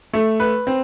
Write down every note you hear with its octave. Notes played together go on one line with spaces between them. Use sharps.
A3
B4
C4